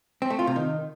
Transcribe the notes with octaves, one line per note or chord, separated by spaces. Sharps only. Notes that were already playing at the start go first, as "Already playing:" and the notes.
C4
A3
F4
C3
D#3